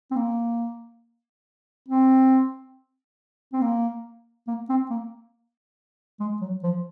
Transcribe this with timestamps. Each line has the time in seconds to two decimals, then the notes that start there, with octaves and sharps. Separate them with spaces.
0.11 C4
0.16 A#3
1.88 C4
3.53 C4
3.62 A#3
4.48 A#3
4.69 C4
4.90 A#3
6.20 G#3
6.41 F#3
6.63 F3